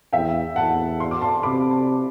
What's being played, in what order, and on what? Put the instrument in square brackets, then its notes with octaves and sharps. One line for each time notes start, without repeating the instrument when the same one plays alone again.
[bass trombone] E2 [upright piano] E5 G5
[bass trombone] E2 [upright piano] F#5 A5
[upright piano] C6
D6
A5 C6
[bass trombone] C3 [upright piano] B5 D6